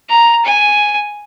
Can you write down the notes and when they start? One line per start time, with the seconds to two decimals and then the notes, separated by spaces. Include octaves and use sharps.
0.09 A#5
0.45 G#5